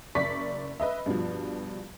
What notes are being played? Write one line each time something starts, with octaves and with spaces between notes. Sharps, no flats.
F#1 D5 C#6 B6
B4 D#5 E5
G2 B2 F3